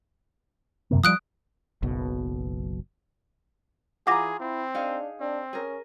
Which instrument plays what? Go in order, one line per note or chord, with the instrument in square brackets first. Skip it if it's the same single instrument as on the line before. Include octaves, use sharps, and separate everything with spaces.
[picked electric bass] F#2 C3 A#3
[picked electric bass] F3 G3 [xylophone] D#6 F#6 D7
[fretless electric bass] F#1 B1 B2
[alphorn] E3 [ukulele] F4 A#5 [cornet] G#4 [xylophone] F#5 D6 A#6
[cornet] C4 [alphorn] E4
[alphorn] D4 [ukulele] D#4 G#4 F5
[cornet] C4 [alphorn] D4
[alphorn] C#4 [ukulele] G#4 A#4